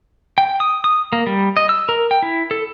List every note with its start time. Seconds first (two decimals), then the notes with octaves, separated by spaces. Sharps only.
0.38 G5
0.60 D#6
0.84 D#6
1.13 A#3
1.27 G3
1.57 D#5
1.69 E6
1.89 A#4
2.11 G5
2.23 E4
2.51 A4